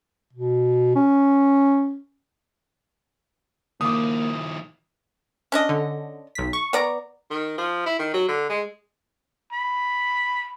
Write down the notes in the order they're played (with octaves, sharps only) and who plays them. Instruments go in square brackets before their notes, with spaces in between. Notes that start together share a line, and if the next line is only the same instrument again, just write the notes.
[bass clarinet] B2
C#4
[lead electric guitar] D#3 F3 [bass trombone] A#3 [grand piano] D6 D#6
[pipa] C#4 D4 D#5
[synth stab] D3
B1 B6
C#6
[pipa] B3 D5 A#5
[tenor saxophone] D#3
F3
E4
D#3
F#3
D3
G#3
[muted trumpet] B5